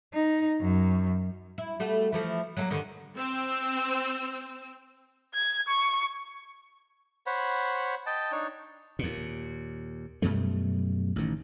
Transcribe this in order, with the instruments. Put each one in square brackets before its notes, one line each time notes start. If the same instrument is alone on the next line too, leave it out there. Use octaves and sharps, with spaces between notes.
[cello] D#4
F#2
[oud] E4
G3 A3 F#4
E3 F3 A3
F#3 A3 A#3
G2 D3 D#3
[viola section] C4 [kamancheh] E6
[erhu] G#6
C#6
[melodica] C5 C#5 F#5 B5
D#5 G5 A5
D4 D#4 C#5
[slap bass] D#2 A#2
F#2 B2 G3 A3
A1 D#3